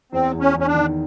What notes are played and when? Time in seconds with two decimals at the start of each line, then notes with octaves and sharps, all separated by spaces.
0.12 E2 C4
0.33 E2
0.40 C#4
0.54 E2
0.59 C#4
0.67 D4
0.74 D#3